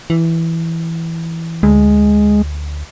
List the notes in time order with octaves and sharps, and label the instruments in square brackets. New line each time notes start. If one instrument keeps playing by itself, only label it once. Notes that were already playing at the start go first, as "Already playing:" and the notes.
[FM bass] E3
[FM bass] D2 [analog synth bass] G#3